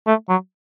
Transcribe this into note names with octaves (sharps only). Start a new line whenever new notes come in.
A3
F#3